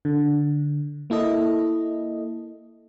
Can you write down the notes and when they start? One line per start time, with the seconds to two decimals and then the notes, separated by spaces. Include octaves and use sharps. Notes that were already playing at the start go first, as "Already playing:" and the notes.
0.05 D3
1.10 A#3 E4 A4 D#5